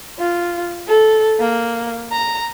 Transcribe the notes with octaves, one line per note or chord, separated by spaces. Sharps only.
F4
A4
A#3
A#5